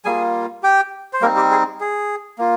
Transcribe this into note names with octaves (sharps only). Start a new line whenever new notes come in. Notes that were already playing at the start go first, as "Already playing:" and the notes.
G3 A#3 F4 G#4 G#5
G4 G5
C5
G3 A#3 C4 D#4 A#4
G4
G#4
G#4
A#3 F4